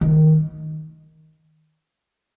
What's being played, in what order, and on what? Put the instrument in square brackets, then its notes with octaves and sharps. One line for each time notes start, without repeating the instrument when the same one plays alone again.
[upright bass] D#3